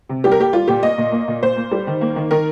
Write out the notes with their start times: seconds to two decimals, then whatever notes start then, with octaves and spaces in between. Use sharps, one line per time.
0.09 C3
0.24 G3 G4
0.32 A#4
0.39 A#3 G4
0.53 G3 F4
0.68 A#2 G4
0.83 A#3 D#5
0.98 A#2
1.12 A#3
1.28 A#2
1.42 A#2 C5
1.57 A#3
1.71 G3
1.87 D#3
2.01 A#3
2.16 D#3
2.31 D#3 A#4